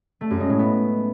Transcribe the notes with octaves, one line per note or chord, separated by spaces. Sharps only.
A3
F#2
G#3
A2
B3